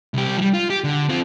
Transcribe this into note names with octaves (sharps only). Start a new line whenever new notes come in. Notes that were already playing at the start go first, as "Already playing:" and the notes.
C2 G4
F3 G3
F4
G4
D3
C4 F4